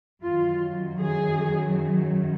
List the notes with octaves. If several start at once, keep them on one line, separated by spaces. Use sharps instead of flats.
F#2 D#3 F#3 F4
G#4